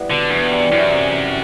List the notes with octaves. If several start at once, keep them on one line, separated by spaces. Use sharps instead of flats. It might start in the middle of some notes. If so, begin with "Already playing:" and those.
Already playing: G3 B3 E4
B2 D3
E2 D4
G3
F#2 E3
C3
B4